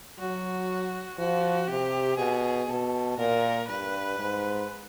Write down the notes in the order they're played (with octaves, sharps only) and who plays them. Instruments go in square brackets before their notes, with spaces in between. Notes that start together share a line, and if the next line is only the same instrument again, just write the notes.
[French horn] F#3 [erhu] F#4
[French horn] F3 [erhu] F#4
[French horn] C3 [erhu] G4
[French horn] B2 [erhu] G#4
[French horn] B2 [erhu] A4
[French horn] A#2 [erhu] A#4
[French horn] G2 [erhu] B4
[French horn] G#2